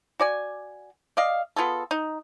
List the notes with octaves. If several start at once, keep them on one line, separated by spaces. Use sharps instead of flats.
F#4 D5 G#5
D5 D#5 F5
B3 F4 G#4 A4
D#4